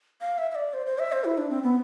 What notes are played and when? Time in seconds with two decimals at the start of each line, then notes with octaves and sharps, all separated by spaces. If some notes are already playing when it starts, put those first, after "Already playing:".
0.21 F5
0.38 E5
0.51 E5
0.55 D5
0.74 C5
0.86 C5
0.99 E5
1.12 C5
1.24 E4
1.38 D4
1.50 C4
1.63 B3